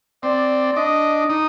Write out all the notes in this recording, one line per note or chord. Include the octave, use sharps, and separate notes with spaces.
C4 D5
D4 D#5
D#4